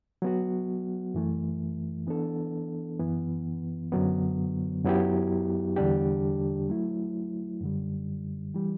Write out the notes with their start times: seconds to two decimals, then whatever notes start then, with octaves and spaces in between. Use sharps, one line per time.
0.22 F#3 B3 F#4
1.14 F#2 E3 A3
2.07 E3 B3 D4 A4
2.99 F#2 E3 B3
3.92 F#2 D3 F#3 B3
4.84 F#2 F#3 B3 E4 G4
5.76 E2 D3 G3 D4 G4
6.69 F#3 A3 E4
7.61 F#2 D3 G3
8.54 E3 G3